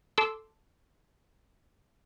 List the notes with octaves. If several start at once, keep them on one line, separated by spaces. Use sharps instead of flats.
A4 C6 D6 E6